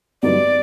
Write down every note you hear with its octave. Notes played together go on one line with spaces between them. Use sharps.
G2 D3 F#3 B3 D#4 D5